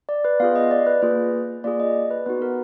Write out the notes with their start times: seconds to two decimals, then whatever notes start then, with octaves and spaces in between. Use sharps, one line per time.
0.09 D5
0.25 B4
0.40 B3 F4 G#4 F5
0.55 D#5
0.71 D5
0.87 B4
1.02 A#3 F4 G#4 B4
1.64 A#3 F4 G#4 D5
1.80 D#5
2.11 B4
2.26 B3 D#4 F#4 B4
2.42 A#4